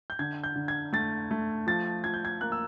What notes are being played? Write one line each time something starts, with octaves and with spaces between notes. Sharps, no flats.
G6
D3 G#6
G6
D3
G#6
A3 A6
A3
F3 A6
F3 G#6
G6
G#6
A#3 F#6
E6